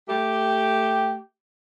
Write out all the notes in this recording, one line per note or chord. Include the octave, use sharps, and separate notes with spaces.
A3 G4